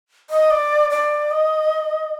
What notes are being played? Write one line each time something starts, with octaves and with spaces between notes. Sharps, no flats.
D#5
D5
D5
D#5